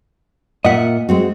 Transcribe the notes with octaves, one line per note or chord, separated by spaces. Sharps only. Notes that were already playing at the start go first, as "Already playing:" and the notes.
A#2 D#5 E5 F#5
G#3 C4 F#4